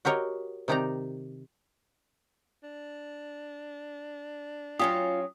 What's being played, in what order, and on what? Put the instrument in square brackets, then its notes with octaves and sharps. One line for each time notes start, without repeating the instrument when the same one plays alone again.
[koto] F#4 G4 A#4 C#5 D#5
C3 D#3 D#4 G4 D5 A#5
[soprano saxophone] D4
[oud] F#3 C#4 G4 [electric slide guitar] F4 [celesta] D#6